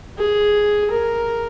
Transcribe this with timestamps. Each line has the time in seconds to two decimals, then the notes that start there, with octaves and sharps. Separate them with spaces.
0.18 G#4
0.91 A#4